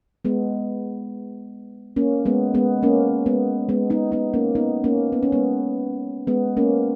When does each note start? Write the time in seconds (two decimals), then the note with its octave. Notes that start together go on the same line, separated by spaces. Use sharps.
0.25 G#3 B3
1.96 A#3 C#4
2.26 G#3 B3
2.54 G#3 B3
2.83 A#3 C#4
3.26 G#3 B3
3.69 G#3 B3
3.90 B3 D#4
4.12 B3 D#4
4.34 A#3 C#4
4.55 B3 D#4
4.84 A#3 C#4
5.12 B3
5.23 C#4
5.32 G#3 B3
6.27 G#3 B3
6.57 A#3 C#4